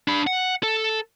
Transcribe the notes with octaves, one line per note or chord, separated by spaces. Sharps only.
D4 B5
F#5
A4